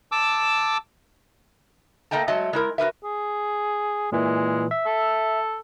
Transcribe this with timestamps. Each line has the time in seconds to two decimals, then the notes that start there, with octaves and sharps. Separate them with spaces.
0.12 A5 D6 E6
2.11 A3 A#3 D#5 G5 A5
2.28 F#3 G#3 A3 D#5 E5 A5
2.53 G#3 E4 A#4
2.78 F#4 A#4 B4 E5
3.04 G#4
4.12 A#2 E3 G#3
4.71 E5
4.86 A4